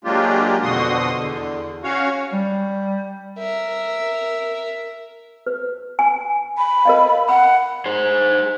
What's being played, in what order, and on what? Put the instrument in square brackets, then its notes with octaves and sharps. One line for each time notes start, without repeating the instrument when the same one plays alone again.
[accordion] F#3 G#3 A#3 D4 F4 G4
F2 B2 D3 F#4 C6 D#6
E2 D3
C#4 F#4 C#5 F5
[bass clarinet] G3
[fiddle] A#4 E5
[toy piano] B4
G#5
[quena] B5
[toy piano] A#4 D#5 F5
[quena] F#5 [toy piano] B5
[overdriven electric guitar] G#4 C5